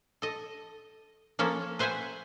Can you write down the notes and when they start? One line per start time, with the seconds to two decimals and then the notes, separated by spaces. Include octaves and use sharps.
0.22 A4 D#5
1.39 F3 A#3 C#4 A4
1.79 B4 C5 E5 F#5 G#5